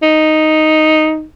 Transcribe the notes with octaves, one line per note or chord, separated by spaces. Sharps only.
D#4